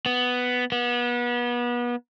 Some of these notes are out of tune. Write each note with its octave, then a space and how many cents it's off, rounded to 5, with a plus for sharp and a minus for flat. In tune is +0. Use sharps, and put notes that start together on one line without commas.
B3 +5
B3 -30